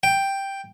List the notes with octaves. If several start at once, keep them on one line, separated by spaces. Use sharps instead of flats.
G5